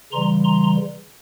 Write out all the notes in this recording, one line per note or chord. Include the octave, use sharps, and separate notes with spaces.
C#3 E3 G3 A#5 C6
A#5 C6